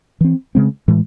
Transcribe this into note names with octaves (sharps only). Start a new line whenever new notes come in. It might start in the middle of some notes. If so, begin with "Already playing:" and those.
E3 C4
C#3 G#3 C4
A2 E3 G#3